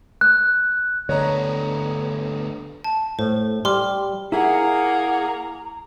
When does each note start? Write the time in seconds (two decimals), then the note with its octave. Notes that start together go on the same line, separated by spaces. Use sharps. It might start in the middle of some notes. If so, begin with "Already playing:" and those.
0.21 F#6
1.09 D2 D3 B3 C#5 D#5 A#5
2.84 A5
3.19 A2 C5
3.65 G3 C6 D6 F6
4.32 A#3 E4 G#4 E5 F#5 A#5